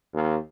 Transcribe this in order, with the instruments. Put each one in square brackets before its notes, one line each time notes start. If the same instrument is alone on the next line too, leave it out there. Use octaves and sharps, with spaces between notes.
[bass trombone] D#2